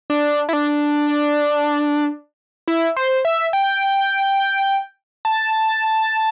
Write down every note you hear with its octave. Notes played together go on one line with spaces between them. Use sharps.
D4
E4
D4
E4
C5
E5
G5
A5